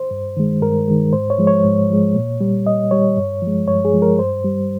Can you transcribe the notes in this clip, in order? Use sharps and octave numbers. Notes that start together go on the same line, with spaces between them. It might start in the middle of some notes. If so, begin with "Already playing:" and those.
Already playing: C5
G2
D#3 G#3
G2 A#4
D#3 G#3
G#2 C5
C#5
F3 G#3
C#5
G#2
F3 G#3
A#2
G3
A#2 D#5
G3 C#5
G2
F3 G#3
G2 C#5
G#4
F3 G#3
A#4
G2 C5
G3